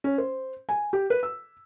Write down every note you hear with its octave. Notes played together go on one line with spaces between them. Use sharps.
C#4
C5
G#5
G4
B4
E6